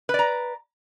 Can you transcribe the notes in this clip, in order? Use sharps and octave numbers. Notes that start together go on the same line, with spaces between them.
B4 D5 A#5